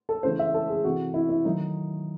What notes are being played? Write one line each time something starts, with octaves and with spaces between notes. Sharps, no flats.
A4
C#3 E3 A3 C5
E5
A4
G#4
C3 E3 A3 F#4
E4
E4
D#3 F#3 A3 D#4